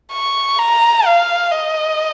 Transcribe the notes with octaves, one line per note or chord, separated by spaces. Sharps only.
C#6
A#5
F5
D#5